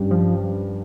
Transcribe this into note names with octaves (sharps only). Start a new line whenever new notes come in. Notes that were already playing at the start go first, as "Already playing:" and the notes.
Already playing: G2 G3 C#4 G4
F3